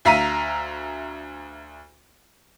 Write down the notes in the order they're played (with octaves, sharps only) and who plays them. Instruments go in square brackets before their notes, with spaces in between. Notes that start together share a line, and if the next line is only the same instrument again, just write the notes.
[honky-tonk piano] D2 E5 F5 A#5 B6 D#7